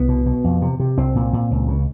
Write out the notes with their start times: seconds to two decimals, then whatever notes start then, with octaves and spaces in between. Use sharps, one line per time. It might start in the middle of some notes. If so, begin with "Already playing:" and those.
Already playing: C2 B3
0.09 B2
0.26 B2
0.44 F2
0.62 C3
0.80 C3
0.98 C2 C4
1.15 A#2
1.33 A#2
1.51 C#2
1.68 C#3